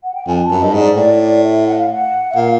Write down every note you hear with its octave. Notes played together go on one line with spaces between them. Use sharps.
F#5
G5
F2 G#5
A5
F#2 E5
G2 D#5
G#2
D5
A2 D5
D5
E5
F#5
F5
F#5
E5
A#2 F5